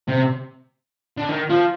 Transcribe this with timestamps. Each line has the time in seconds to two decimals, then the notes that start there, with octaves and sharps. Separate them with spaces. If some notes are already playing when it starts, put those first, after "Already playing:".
0.08 C3
1.17 D3
1.29 D#3
1.50 F3